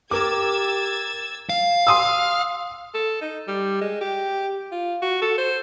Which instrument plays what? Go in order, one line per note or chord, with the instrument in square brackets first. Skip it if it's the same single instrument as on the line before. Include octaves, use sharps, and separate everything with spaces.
[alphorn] G4 [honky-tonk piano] A#4 D6 [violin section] E6 G#6 A6
[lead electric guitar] F5
[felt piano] C6 D#6 E6
[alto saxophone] A4
D#4
G3
G#3
G4
F4
F#4
A4
C5